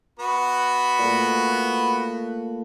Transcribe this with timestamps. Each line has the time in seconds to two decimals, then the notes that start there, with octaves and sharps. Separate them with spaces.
0.19 B3 F#4 B5
0.99 A#2 A3